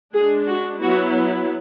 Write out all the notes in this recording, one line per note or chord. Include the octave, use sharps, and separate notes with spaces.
G#3 D4 G#4
F#4
F#3 B3 E4 F#4